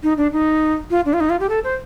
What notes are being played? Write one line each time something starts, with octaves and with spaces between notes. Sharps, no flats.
D#4
D4
D#4
F4
D4
F4
D#4
F4
G4
A4
C5